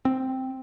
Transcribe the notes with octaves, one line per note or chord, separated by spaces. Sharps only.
C4